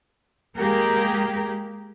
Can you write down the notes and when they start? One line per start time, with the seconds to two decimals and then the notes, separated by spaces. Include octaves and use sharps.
0.55 G#3 A#3 G4 G#4 A#4